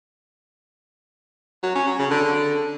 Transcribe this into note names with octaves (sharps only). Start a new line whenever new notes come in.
F#3
C#4
F#3
C#3
D3